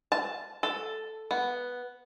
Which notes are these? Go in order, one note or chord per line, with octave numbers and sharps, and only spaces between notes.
A5
A4
B3